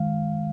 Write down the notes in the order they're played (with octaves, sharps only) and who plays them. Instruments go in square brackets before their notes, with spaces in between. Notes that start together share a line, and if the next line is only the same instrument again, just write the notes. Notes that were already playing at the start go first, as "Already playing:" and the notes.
Already playing: [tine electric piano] D#3 G#3 F5